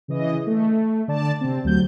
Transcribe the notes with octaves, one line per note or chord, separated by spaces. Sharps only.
C#3 E3 D#5
A3
D3 D5 A5
C3 C4
D2 F#3 G6